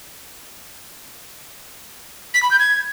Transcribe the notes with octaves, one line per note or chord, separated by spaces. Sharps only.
B6
B5
G6
G#6